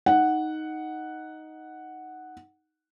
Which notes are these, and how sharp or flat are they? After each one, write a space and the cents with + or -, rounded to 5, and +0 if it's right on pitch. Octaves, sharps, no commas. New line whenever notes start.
D#4 +5 F#5 +0